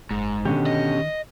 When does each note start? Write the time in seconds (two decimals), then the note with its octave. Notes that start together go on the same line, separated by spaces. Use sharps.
0.11 F#1 G#2
0.45 B2 D3 D#3 C#4 G4
0.66 D#5